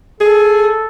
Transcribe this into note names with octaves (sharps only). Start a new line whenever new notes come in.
G#4 A4